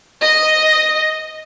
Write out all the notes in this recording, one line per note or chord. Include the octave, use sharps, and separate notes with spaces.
D#5